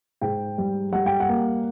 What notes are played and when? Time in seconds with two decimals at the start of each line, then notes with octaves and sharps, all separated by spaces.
0.21 G#2 G5
0.58 G3
0.92 G3 F#5
1.06 G5
1.20 F#5
1.29 A#3